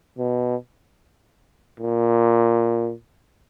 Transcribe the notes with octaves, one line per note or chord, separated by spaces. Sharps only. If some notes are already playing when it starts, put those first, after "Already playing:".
B2
A#2